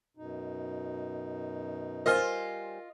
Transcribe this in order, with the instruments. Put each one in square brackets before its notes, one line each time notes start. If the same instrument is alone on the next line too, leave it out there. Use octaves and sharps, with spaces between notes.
[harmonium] F#2 B2 D#4
[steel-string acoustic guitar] G3 C5 G#5 [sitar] F4 D#5 [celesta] A#4 F6